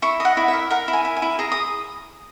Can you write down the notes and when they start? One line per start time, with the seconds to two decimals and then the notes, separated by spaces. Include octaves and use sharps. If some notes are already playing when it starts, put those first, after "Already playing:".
0.02 E4 C#6
0.20 D#5 F#5
0.37 E4
0.48 E5
0.53 A#4
0.70 A#4 F#5
0.88 E4
0.93 G#5
1.05 E4
1.17 G#5
1.22 E4
1.39 G#4 A#5
1.52 D#6